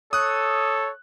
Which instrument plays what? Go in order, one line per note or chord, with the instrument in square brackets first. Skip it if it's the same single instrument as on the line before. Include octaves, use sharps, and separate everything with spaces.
[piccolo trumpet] A4 [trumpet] C#5 [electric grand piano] D#6 F#6